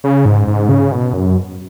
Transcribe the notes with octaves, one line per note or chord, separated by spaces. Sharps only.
C#3
G#2
G#2
C#3
B2
F#2